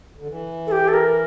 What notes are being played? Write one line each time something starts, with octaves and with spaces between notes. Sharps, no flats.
D3
E3
A4
G4
A4
A#4